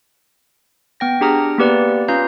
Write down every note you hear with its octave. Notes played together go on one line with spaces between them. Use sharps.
B3 G5 A#6
D4 G4 G#4 A#5 D#6 F6
A#3 B3 G4 B4 D5
C#4 F4 B4 F5 A#5 G6